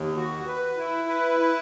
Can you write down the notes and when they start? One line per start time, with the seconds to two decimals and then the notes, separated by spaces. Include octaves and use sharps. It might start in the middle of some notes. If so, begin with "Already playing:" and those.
Already playing: D#2
0.16 F#4
0.47 B4
0.78 E4
1.09 B4
1.40 E4